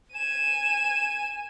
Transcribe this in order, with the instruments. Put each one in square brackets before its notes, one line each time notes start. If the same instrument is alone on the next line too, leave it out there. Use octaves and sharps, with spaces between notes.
[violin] G#5 D#7 [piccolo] E7